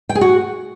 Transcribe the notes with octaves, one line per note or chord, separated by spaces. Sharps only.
G5
G#4
F#4